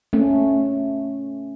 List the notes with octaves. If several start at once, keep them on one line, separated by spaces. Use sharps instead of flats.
A3 C#4